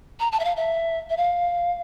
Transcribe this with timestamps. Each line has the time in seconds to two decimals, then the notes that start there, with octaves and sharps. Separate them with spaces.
0.20 A#5
0.32 A5
0.40 E5
0.45 F5
0.56 E5
1.10 E5
1.17 F5